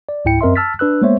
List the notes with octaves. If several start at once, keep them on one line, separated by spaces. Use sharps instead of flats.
D5
C#2 G#2 E4 G5 C#7
F#2 C4 A#4 D#5 E5 C6
A5 E6 F6 A6 B6
D4 B4 E6 F#6
G#3 A#3 B3 C5 C#5 E5